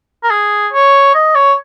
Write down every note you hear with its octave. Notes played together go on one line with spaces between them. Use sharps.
A#4
G#4
C#5
D#5
C#5